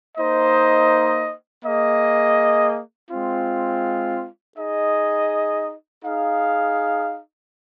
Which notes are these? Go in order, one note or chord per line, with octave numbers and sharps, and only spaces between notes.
A#3 D#4 C5 D#5
A#3 G#4 D#5
G#3 C4 F4
D#4 G#4 D#5
D#4 G#4 F5